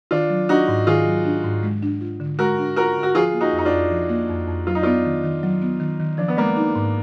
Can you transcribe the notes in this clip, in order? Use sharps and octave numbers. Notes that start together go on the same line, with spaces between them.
D#3 D4 F4
F#3
D4 D#4 F#4
G#2
D#3 F4 G#4
F#3
D4
G#2
G#3
D4
F4
D3
G#3 F#4 A#4
D4
F4 F#4 A#4
D3
F#4
F3 F4 G#4
A#3
D#4 F#4
F2
D#4
D4 F4
F2
F3
A#3
F2
F2
F#3 F4
D#4
B3 D4 F4
D#3
D#3
F#3
B3
D#3
D#3
F3 D4
B3
G#3 A#3 D4
D#4
G#2